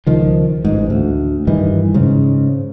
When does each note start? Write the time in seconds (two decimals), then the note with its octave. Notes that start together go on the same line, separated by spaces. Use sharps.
0.07 C#2 D#3 F3
0.65 A1 G#2
0.90 D2
1.47 G2 D#3 E3
1.94 G#2 C#3